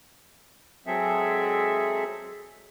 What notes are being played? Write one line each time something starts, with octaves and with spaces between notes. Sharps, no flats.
F#3 G#3 C4 G#4 A4 E5